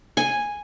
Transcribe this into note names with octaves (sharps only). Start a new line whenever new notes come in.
G#5